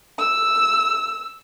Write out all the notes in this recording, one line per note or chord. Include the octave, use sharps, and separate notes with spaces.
E6